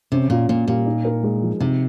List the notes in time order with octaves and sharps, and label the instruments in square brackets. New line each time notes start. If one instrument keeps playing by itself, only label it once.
[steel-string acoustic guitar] C3 [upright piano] C#4
[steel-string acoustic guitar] A#2 [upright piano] F4
[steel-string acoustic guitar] A#2 [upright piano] A#3
[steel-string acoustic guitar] A#2 [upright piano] G3
[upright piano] D#4
A#4
G#3
F3
[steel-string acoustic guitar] C3 [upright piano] D#4